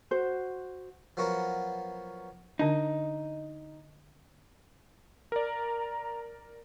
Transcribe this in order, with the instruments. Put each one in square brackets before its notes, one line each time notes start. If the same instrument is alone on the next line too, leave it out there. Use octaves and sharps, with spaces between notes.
[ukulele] F#4 C5
[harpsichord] F3 F#3 B3 F#4 A#4
[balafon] D3 D4 [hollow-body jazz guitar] D#4
[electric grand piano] A#4 D5 [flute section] A#5